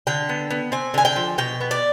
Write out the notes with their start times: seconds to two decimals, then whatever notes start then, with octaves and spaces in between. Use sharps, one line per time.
0.07 D3 G5
0.29 B3
0.50 B3
0.72 C4 G#5
0.94 D3 G#5
1.05 G5
1.16 F3
1.38 B2 G5
1.61 B3
1.71 D5